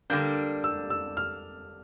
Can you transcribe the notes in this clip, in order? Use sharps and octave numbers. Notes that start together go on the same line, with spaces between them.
D3 G3 A#3 D4 G6
E6
E6
F6